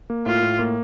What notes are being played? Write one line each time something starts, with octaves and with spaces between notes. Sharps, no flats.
A#3
A2 F4
A2
A#3